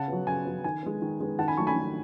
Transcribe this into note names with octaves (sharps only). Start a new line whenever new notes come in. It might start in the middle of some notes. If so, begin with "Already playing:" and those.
Already playing: C#3 F#5 A5
F#3 B3
C#3 G#5
F#3 B3
D#3 G#5
G#3 B3
D#3
G#3 B3
D#3 F#5 A5
G#5 B5
F#3 A3 A5 C#6
G#5 B5
D#3